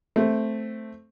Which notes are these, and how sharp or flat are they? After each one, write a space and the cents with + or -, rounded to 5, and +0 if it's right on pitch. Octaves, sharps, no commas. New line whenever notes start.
A3 +0 C4 +0